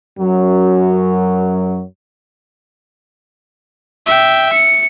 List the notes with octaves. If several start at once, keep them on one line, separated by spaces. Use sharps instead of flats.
F#2 F#3
E5 G5
C#7